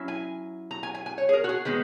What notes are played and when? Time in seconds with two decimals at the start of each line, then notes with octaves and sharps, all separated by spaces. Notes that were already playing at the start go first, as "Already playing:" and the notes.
Already playing: F#3 C#4 E4
0.08 G#5
0.71 A#5
0.83 G#5
0.95 G#5
1.06 G#5
1.18 C#5
1.29 G#4
1.33 A#4
1.44 F#4
1.49 G#4
1.65 D#3 G#3 B3